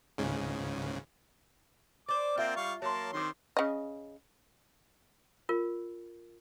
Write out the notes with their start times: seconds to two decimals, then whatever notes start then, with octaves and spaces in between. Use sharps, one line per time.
0.18 C#2 G#2 C#3
2.09 C5 D5 D6
2.38 A#3 C4 F4 E5 F#5 G5
2.56 G3 F5 C#6
2.82 F#3 A#3 C#5 A5 C6
3.13 D#3 C4 D4 G4 C6 D6
3.57 C#3 D#5
5.49 F4 A#4